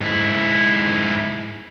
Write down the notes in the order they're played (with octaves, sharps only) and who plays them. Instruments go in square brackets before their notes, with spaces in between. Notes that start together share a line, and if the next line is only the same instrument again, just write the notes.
[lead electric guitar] G#2 E4